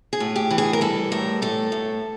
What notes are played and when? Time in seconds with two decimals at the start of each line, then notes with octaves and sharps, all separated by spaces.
0.13 G#4
0.20 A2
0.36 G4
0.51 E3
0.58 G#4
0.73 A#4
0.81 G3 A4
1.12 A2 A#4
1.42 A2 A4
1.72 A2